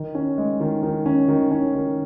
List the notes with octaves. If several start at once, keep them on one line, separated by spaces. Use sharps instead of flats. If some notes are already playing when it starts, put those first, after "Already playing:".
Already playing: D#3
C#4
G#3
D#3
D#3
C#4
D#3
C#4
D#3